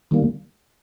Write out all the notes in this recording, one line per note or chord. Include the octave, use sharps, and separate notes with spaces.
D#3 G3 A#3